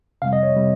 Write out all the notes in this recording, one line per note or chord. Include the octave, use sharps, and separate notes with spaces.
F2 C3 G3 F5
D#5
C#5
C3 G3